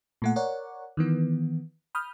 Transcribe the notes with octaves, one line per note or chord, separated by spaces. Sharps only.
A#2 A3 F#5
A#4 C#5 D5 F#5
D#3 E3 B3
B5 D#6 F6 G6